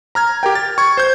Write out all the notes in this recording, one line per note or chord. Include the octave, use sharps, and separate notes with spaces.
A#5 F6 G#6
G4 A#4 G5
A6
C#6 G#6
C5 G6